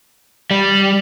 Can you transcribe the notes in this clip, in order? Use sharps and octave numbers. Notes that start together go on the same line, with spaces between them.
G3